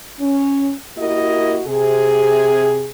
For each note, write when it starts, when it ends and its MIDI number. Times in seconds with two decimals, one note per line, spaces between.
0.20 0.73 61
0.97 1.60 58
0.97 1.60 64
0.97 1.60 66
0.97 1.60 67
0.97 1.60 70
0.97 1.60 75
1.67 2.91 48
1.67 2.91 68